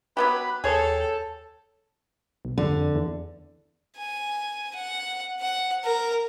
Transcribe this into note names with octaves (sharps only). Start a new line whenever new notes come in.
F#3 B3 G4 B4 B5
D#2 G#4 A4 C#5 G5
B1
F2 D3
E2
G#5
F#5
F#5
A#4